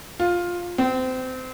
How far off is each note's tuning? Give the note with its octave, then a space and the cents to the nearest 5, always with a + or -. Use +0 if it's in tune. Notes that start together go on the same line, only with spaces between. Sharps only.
F4 +10
C4 -25